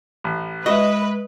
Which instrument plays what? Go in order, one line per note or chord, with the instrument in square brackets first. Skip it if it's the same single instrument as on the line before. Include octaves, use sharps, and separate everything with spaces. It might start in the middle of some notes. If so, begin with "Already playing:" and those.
[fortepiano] A1
[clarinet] G#3 [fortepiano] F#4 E5 [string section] B4 [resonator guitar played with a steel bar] D#5